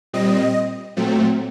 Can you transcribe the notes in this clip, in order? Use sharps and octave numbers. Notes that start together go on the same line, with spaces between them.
A#2 G3 C4 D#5
A#2 F#3 A3 C4